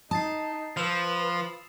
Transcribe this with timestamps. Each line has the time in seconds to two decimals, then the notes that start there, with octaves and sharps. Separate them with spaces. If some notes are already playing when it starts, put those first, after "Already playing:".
0.11 D#4 A5 D#6 A6 C7
0.77 F3 B4 E6 E7 F7